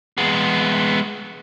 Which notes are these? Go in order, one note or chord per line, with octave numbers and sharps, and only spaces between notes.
G#3 B3